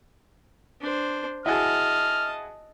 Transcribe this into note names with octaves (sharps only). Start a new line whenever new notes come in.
D4 C5
E4 F#4 G#4 D#5 A5 F6